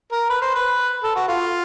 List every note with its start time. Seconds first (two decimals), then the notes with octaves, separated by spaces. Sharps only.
0.12 A#4
0.30 B4
0.42 C5
0.55 B4
1.04 A4
1.16 F#4
1.28 F4